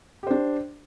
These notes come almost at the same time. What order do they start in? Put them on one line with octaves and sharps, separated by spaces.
G4 C5 D4